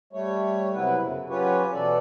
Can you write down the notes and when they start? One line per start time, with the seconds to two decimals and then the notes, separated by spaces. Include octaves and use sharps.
0.13 G3 A3 C#5
0.75 C3 F#3 B3 E4 B4
0.99 F#2 C#3
1.29 F#3 C#4 F4 G4 B4 C#5
1.73 B2 E3 A4 D5